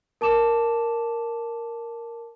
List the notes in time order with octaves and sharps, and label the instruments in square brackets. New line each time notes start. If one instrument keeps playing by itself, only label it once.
[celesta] A#4 A5 D6 E7